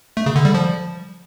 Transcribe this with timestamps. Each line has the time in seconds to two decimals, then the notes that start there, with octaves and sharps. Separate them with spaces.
0.17 A3
0.26 C#3
0.36 D3
0.45 G3
0.54 F3